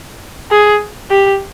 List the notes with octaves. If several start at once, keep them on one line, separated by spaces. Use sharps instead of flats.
G#4
G4